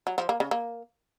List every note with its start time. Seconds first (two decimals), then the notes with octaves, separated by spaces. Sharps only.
0.07 F#3
0.18 F3
0.29 A#3
0.40 C#3
0.51 A#3